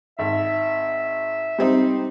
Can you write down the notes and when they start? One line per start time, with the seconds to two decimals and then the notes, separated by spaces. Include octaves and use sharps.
0.19 G#1 E5
1.58 G3 C4 D#4